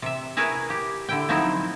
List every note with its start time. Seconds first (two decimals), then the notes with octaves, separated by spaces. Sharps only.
0.02 C3 E5
0.37 E4 G#4 A#4 B4 C#5
0.70 G4
1.09 D3 E4 G5
1.29 F3 F#3 C4 D#4 E4